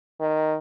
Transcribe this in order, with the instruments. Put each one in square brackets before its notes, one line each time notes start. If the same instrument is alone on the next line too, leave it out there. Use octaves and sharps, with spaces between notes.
[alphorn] D#3